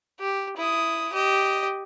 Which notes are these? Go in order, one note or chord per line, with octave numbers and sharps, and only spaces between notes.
G4
E4 D#6
G4 D#5